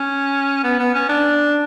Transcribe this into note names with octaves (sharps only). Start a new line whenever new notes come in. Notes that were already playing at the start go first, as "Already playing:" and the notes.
Already playing: C#4
B3
B3
C#4
D4